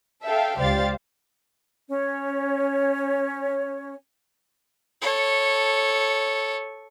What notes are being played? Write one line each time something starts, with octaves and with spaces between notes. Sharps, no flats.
A4 E5 F5 G5
C#2 G4 C5 D5 F5 A6
C#4 C#5
A4 C#5